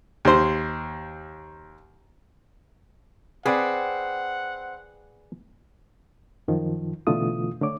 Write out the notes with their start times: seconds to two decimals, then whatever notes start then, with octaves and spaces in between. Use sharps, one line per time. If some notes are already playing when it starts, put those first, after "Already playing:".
0.25 D#2 C5
3.46 C4 G#4 B4 D5 F#5
6.48 F#2 D#3 F3
7.07 B2 D3 E3 A3 F4 D#6
7.62 D3 A3 C#5 D6